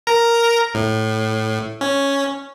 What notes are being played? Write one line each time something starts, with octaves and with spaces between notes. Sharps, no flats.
A#4 A#5
A2
C#4